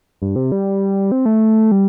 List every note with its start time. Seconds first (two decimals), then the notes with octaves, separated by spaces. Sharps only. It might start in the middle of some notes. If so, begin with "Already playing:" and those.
0.22 G2
0.36 C3
0.52 G3
1.12 C4
1.26 A3
1.72 G3